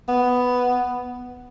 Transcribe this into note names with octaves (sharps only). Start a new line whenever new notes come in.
B3